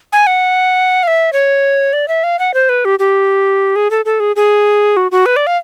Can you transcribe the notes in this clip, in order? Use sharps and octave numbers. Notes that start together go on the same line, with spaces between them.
G#5
F#5
F5
E5
C#5
D5
E5
F5
F#5
C5
B4
G4
G4
G#4
A4
A4
G#4
G#4
F#4
F#4
B4
D5
F5